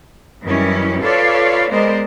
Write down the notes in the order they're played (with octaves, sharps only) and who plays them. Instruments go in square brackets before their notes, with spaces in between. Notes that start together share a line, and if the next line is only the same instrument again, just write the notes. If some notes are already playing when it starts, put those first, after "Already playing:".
[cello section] F#2 D#3 E3 G3 C#4 E4
F4 A4 B4 C#5 D5 F5
G#3 B3 A#4 C5 D5 D#5